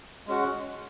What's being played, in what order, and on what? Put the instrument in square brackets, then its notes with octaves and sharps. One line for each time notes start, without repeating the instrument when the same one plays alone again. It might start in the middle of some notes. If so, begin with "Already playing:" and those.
[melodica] G#3 C#4 F#4